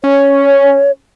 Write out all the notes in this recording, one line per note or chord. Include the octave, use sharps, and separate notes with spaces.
C#4 C#5